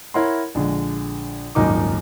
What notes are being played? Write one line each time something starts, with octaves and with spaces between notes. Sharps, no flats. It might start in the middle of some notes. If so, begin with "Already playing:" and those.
E4 A#4 C#5 F#5 C6
A#1 D3 G#3
D#1 G#1 F#2 D#4 A#4 D6